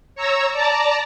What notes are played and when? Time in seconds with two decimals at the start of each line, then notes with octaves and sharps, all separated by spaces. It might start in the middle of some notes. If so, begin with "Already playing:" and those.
0.15 C#5 A#5 E6
0.52 D5 A5 A#5